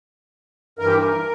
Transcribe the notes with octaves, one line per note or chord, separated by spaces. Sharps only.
G2 E3 A#4
G4
A#4